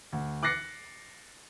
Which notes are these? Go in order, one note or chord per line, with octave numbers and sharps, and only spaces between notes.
D2
D6 F#6 A6 A#6 C7 C#7